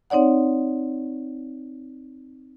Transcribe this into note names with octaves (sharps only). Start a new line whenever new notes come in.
C4 D#4 C#5 D5 F#5